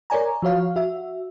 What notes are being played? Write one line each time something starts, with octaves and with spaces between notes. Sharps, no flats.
A#4 C#5 D5 G#5 A#5
F3 F#4 C#5 F5
F#4 E5